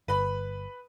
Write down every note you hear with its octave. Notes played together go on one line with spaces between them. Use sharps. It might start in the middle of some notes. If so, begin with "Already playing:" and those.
G1 B4 B5